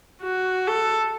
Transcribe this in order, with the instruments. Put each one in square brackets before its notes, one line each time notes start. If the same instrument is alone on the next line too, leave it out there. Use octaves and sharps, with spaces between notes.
[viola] F#4
A4